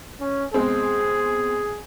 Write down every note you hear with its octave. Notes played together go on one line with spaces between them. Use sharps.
C#4
B2 G#3 C4 G#4